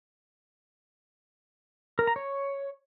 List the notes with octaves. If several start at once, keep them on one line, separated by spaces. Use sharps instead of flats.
A#4
A#5
C#5